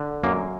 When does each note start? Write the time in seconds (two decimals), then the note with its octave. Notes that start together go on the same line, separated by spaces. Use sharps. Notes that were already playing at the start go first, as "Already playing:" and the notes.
Already playing: D3
0.24 F#2 A#3